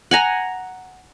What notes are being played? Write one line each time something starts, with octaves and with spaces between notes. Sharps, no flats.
F#5 G#5 A#5